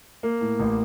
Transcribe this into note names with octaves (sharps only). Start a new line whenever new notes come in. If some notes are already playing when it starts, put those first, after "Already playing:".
A#3
A2
A1